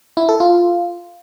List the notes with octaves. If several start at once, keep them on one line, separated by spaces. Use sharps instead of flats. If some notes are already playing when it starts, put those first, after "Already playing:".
E4
A4
F4